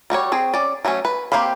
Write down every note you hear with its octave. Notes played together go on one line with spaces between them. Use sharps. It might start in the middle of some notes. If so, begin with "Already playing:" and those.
G3 F#4 A#4 C#5
C4 G#4
C#4 D5
F#3 A3 B3 C#4
B4
A#3 C4 G4 F5 B5